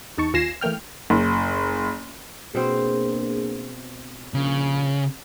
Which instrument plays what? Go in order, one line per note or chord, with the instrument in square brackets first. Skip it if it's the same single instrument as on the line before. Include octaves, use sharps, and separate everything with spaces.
[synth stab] E2 D#4 A5 C#6
D#2 F4 G#5 A#6 C7 E7
E3 A3 A#3 G5 F6
[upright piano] F#1
[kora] B2 C4 C5 [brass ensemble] A#3 D4 G#4
[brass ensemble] A#1 [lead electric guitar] C#3